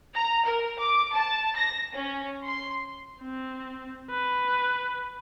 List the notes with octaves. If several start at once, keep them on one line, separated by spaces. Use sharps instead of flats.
A#5
A#4
D6
A5
A#6
C#4
C6
C4
B4